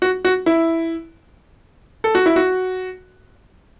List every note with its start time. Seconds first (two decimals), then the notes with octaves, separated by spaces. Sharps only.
0.02 F#4
0.25 F#4
0.46 E4
2.04 A4
2.15 F#4
2.26 E4
2.36 F#4